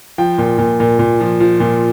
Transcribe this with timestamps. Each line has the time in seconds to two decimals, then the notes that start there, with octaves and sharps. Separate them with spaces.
0.18 F3 G5
0.38 A#2
0.58 A#2
0.80 A#2
0.99 A#2
1.20 F3
1.40 F3
1.60 A#2